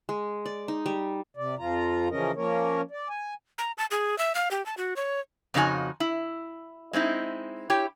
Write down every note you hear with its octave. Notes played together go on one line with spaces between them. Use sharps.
G#3
D5
D#4
G3
C3 D5
F2 F3 F4 A#5
C#3 E3 F3 C#4 A#4 D#5
F3 A#3 C#4 A#4 C#5
D5
G#5
A#5
A5
G#4
E5
F5
G4
A5
F#4
C#5
F2 C#3 D#4 E4 F#4 G#5
E4
G#3 C4 D#4 E4
E4 G4 C#5 G5